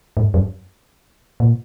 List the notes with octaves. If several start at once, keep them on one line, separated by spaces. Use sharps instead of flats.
G#2
F#2
A#2